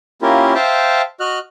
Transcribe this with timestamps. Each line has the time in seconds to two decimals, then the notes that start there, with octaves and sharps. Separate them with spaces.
0.22 A#3 C#4 E4 F4 G4 A#4
0.55 C5 E5 F5 G5 A5
1.20 F#4 D#5 F6 F#6